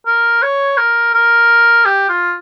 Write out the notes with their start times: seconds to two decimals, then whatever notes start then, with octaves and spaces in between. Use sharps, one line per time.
0.07 A#4
0.42 C#5
0.77 A#4
1.14 A#4
1.85 G4
2.09 F4